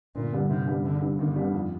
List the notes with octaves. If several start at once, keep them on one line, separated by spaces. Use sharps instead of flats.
G1 A#2
G2 D3 G3
G1 C3
G2 D3 G3
G1 D3
G2 D3 G3
G1 D#3
G2 D3 G3
F2